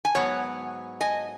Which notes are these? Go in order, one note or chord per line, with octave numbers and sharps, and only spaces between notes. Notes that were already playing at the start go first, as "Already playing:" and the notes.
G#5
G#2 F#3 B3 C#5 F#5
D#5 G#5